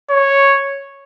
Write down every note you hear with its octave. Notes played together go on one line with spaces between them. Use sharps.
C#5